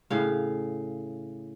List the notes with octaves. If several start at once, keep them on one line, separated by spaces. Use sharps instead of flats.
A2 C#3 F5